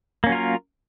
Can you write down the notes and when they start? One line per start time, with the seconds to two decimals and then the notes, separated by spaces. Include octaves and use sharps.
0.24 A#3
0.26 C#4
0.29 F#3
0.32 F4
0.35 A#4